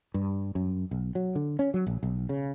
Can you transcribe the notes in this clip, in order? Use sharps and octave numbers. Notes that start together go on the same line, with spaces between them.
G2
F#2
B1
F#3
D3
C#4
F#3
A#1
B1
C#3